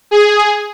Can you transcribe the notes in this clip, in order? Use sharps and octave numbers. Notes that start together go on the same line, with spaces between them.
G#4